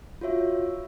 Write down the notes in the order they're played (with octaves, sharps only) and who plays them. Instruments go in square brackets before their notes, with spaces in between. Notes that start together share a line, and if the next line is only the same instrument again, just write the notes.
[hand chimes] F4 F#4 C#5 E5